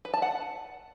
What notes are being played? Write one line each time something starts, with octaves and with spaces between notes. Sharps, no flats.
B4
A5
F#5